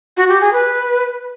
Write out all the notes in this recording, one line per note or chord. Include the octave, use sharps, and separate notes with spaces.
F#4
G4
G#4
B4